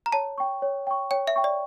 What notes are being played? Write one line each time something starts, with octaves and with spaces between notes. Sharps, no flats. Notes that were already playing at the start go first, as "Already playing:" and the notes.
A#5
C#5 A5
G5 C#6
C#5
G5 C#6
C#5 G5
E5
G5 C#6
D5